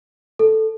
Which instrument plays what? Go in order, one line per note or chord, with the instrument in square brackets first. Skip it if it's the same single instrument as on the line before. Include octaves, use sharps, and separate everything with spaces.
[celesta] A4